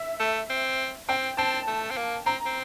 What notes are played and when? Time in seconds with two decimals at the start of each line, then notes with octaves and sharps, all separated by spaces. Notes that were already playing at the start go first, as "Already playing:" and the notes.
Already playing: E5
0.20 A3
0.50 C4
1.09 C4 G5
1.37 C4 A5
1.67 A3
1.90 C4
1.97 A#3
2.26 C4 A#5
2.46 C4